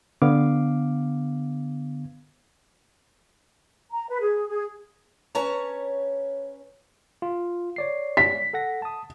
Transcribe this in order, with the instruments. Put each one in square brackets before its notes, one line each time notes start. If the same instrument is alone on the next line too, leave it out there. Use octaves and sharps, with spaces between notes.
[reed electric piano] D3 B3 F5 D6
[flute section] A#5
B4
G#4
G#4
[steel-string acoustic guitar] C#4 B4 C#5 A5 A#5
[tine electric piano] F4
C#5 D5 C7
[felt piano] B6
[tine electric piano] A4 F#5 A#6
A5 D#6